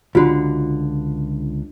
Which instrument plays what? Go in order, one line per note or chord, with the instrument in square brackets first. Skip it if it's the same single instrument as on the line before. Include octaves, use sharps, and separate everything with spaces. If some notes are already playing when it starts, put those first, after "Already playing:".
[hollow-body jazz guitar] C#2 D3 [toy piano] F4 F#4